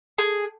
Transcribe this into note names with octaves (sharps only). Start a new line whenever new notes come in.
G#4